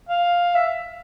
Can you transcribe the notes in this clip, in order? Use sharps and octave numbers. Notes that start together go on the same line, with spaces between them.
F5
E5